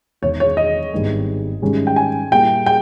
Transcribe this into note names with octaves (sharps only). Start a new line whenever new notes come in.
E1 E2 D#3 C#5
C#5
D#5
G#1 G2 D#3 G#3 B3
G#2 D#3 G3 C#4 G#4
G5
G#5
A#2 G3 A#3 E4 G5
G5